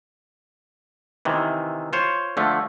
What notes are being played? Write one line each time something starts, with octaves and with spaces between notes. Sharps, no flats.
C3 D#3 E3
F4 C5 C#5
D3 F3 A3